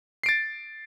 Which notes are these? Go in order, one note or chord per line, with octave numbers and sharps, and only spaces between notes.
A6 C7 D7